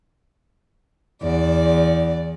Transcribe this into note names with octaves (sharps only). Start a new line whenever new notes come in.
E2 D5